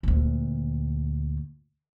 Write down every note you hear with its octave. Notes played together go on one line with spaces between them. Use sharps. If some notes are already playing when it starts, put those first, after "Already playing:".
D2 A#2